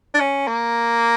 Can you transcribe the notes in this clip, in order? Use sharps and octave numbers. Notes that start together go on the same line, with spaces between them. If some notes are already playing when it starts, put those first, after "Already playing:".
D4
C#4
A#3